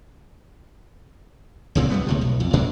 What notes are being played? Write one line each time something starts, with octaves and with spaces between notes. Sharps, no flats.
C#2 A#2 C4
F#2 G3 B3
C#2 A2 C3
B1
F2
F#2 A#2 D4